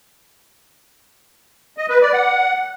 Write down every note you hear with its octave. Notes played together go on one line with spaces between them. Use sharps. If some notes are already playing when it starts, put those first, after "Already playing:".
D#5
B4
D5
F#5